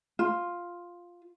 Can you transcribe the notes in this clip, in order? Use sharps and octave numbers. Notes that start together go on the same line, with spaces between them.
F4